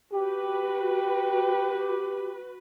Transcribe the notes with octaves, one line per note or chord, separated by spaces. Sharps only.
F#4 G4 B4